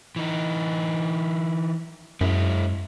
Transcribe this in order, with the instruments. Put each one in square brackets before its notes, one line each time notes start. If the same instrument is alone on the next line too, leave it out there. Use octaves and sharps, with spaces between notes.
[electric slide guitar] E3 D#4
[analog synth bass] F#2 [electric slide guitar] G#3 E4